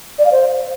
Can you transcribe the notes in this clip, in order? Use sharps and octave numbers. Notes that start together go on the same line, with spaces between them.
D5
F5
C5